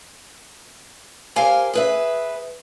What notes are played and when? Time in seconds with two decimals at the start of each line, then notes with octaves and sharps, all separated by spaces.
1.36 G4 A#4 C5 F5 G#5
1.74 G#4 B4 E5